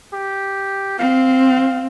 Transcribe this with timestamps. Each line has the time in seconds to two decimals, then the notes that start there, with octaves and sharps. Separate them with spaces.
0.13 G4
0.99 C4 F5